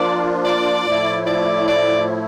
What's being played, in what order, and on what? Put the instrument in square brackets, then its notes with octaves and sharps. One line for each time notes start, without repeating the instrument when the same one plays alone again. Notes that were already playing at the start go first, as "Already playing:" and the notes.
Already playing: [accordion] F3 A#3 D4 F4 [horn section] D5
[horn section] D5
[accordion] A2 F3 A3 E4
[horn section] D5
D5